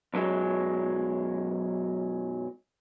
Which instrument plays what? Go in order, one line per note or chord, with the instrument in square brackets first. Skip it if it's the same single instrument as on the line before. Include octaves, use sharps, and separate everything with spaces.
[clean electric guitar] B1 F#2 F#3 G#3